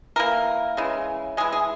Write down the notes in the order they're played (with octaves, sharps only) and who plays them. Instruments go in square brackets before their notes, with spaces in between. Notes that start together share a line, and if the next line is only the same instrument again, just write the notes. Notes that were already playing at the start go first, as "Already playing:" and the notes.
[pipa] E3 A#3 A#4
C#3 E3 G#3
E3 G#3 G#4
G#4